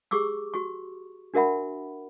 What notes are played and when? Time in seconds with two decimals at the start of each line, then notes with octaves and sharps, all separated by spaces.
0.11 G4 G#4 C#6 D6 E6
0.54 F#4 C#6
1.34 D4 F#4 A#4 E5 F#5 B5